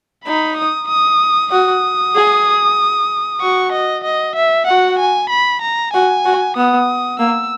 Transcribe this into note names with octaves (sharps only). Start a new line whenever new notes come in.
D#4 B5
D#6
D#6
F#4 D#6
G#4
F#4 C#6
D#5
D#5
E5
F#4 F#5
G#5
B5
A#5
F#4 G#5
F#4
B3 D#6
A#3 E6